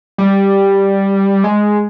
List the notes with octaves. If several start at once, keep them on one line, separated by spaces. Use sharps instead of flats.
G3
G#3